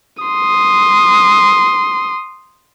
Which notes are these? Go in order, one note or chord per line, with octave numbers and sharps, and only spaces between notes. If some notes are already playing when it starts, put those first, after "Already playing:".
C6 D#6